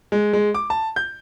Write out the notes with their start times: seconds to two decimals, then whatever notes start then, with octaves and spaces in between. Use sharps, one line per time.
0.12 G#3
0.33 G#3
0.54 D6
0.70 A5
0.96 G6